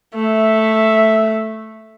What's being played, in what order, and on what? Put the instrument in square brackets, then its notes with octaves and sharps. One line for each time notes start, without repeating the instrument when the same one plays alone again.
[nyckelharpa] A3 [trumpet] E5